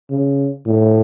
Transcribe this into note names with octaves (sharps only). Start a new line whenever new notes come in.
C#3
A2